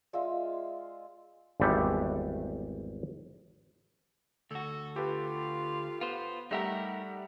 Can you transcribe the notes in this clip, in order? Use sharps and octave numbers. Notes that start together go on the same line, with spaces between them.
G#3 F4 D5 E5 F5 E6
G#1 E2 G3 A3 C5 F#5
D2 F#4 A4
F4 G4 A4 B4
B3 F4 C5
G3 A3 D#4 G4 A#4 E5 F#5